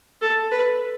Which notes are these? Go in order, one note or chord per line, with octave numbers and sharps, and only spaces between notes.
A4
B4